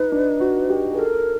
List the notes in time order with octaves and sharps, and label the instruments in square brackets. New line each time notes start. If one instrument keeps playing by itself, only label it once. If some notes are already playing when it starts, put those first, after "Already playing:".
Already playing: [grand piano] D#4 [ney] B4
[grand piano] D4
F#4
G4
[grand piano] G#4 [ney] B4
[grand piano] A4 [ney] A#4